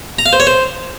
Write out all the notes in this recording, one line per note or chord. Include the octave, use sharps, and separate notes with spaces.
A#5
F5
C5
C#5
C5